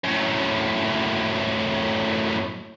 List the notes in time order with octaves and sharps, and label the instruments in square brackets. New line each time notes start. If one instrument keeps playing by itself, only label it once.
[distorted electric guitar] F#2 A2